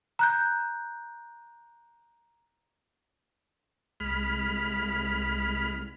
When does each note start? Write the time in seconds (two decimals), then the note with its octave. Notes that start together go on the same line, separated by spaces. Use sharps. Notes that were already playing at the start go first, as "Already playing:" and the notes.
0.19 A#5 F#6 G6
4.00 C2 G#3 B5 F6